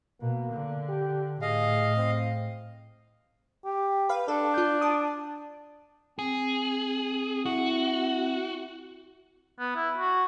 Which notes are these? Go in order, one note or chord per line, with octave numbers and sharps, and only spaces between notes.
B2 A#3
D3
G4
A2 G#4 D#5 F5
C4
G4
B4 F5
D4 A4
F4 G6
A5 D6 D#6
C4 G#4
E4 F#4
B3
E4
F#4